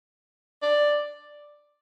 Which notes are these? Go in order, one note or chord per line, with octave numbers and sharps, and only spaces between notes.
D5